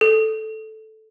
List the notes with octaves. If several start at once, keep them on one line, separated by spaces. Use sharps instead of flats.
A4